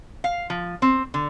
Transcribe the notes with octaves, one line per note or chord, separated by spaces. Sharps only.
F5
F3
C4
D3